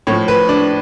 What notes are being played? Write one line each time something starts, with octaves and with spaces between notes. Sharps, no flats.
A2 F3 C#5
B4
D4